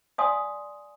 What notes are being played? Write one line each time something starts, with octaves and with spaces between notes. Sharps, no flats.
D5 F5 G#5 C6 D#6